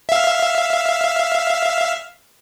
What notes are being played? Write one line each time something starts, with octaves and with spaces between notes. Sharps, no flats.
E5 F5